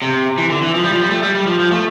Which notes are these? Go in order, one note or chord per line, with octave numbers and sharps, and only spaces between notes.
C3
E3
D3
E3
F3
G3
F3
G3
A3
G3
G3
F3
F3
A3